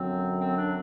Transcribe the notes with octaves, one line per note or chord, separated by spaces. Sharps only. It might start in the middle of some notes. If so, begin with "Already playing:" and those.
Already playing: F#2 D3 F#3 C4
C4
D4